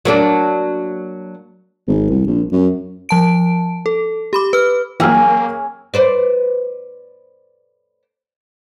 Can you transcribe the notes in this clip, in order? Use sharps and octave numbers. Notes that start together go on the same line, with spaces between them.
F#3 A#3 D4
G#1
C2
A#1
F#2
F3 A5 D7
A4
G4 B5 D6
B4 F6
E3 F#3 A#3 C#4 G#4 G5 E6 F6
B4 C5 D5